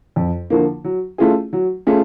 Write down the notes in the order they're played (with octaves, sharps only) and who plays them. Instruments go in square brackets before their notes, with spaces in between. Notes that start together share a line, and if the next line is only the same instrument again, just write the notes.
[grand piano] F2
D3 F3 A#3
F#3
A3 C#4 F4 G#4
F#3
A3 C#4 F4 G#4